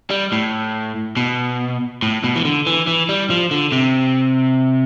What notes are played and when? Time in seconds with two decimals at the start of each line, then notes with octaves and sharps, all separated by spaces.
0.10 G3
0.32 A2
1.17 B2
2.02 A2
2.24 B2
2.36 E3
2.45 D3
2.66 E3
2.87 E3
3.09 G3
3.30 F3
3.51 D3
3.72 C3